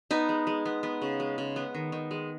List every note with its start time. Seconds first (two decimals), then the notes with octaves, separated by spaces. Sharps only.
0.11 B3 D#4
0.29 G#3
0.47 G#3
0.66 B3
0.83 B3
1.02 C#3
1.20 G#3
1.38 C#3
1.56 B3
1.75 D#3
1.92 D#3
2.11 G#3